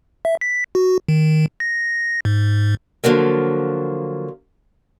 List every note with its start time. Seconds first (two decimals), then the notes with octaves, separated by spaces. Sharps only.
0.25 E5
0.41 B6
0.75 F#4
1.08 D#3
1.60 A#6
2.25 G#2
3.04 D3 F3 F#3 A#3